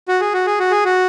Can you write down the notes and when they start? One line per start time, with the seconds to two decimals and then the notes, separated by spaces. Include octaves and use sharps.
0.08 F#4
0.21 G#4
0.34 F#4
0.46 G#4
0.59 F#4
0.71 G#4
0.85 F#4